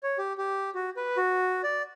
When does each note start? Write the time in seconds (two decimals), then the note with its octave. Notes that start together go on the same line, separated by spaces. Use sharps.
0.03 C#5
0.18 G4
0.38 G4
0.75 F#4
0.97 B4
1.17 F#4
1.63 D5